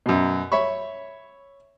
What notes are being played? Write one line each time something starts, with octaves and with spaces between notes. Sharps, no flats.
F#2 B2
C#5 E5 B5 C#6